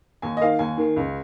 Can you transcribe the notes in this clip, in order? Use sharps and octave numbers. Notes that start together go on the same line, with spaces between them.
D#2 G#5
D#5
D#3 A#3 F5
D#2 G#5
D#3 A#3
C#2